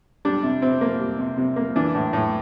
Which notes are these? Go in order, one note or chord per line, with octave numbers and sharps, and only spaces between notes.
G3 D4
C3
C3 C4
A#3
G3
C3
C3
A#3
E3 D4
A2
A2